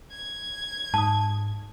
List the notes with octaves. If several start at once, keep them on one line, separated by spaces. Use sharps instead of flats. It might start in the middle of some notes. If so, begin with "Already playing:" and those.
G#6
G#2 A5 D#6